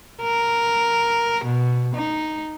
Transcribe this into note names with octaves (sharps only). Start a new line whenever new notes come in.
A#4
B2
D#4